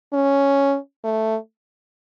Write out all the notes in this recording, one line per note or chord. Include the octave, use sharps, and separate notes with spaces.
C#4
A3